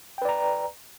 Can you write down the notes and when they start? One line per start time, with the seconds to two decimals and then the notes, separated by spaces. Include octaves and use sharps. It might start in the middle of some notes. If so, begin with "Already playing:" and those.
0.18 G5
0.22 B4
0.25 D5
0.29 A#5